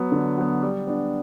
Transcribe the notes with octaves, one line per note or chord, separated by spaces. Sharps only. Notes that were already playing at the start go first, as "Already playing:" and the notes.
Already playing: F#3 B3
D3
F#3 B3
G3
B3 D4